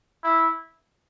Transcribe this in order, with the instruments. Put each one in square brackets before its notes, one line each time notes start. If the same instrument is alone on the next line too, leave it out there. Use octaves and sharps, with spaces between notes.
[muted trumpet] E4